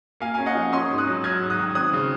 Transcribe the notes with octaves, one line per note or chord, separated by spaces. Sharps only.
A#3 F5 G#5
F5 G#5
C#4
D#5 F#5
F3
C#4 C6 D#6
G#2
D#6 F#6
F#3
F#3 F6 G#6
G#2
D#6 F#6
D#3
C4 D#6 F#6
C#3